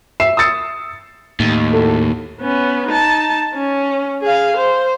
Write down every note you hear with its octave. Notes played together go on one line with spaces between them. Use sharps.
E5 C7 E7
D#6 E6 A6 C#7
D#2 A2
E4 F#4 A4
B3 C#4
D#4 A5
C#4
G#4 F5
C5